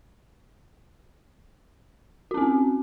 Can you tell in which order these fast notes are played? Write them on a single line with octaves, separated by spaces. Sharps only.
F#4 C#4 C4